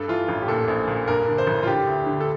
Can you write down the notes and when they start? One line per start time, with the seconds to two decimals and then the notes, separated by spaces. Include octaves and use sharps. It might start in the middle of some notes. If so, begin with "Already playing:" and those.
Already playing: G2 A4
0.08 E3 F4
0.29 A1
0.42 G4
0.48 A#2 A4
0.68 A#1
0.88 A#2
1.08 G2 A#4
1.28 D3
1.38 C5
1.47 A1
1.63 F4
1.67 D3 G4
1.87 D2
2.06 D3
2.21 A4